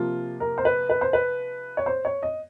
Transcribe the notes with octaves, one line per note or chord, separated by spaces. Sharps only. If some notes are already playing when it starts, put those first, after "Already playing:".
Already playing: C3 F3 A#3 F4
A#4
C5
B4
B4
C5
B4
C#5
C5
C#5
D#5